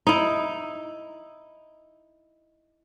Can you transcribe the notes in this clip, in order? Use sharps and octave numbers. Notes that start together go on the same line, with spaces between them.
D#4 E4